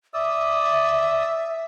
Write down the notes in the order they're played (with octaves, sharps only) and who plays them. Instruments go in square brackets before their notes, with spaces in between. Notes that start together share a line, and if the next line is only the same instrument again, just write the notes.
[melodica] D5 D#6 E6 [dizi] E5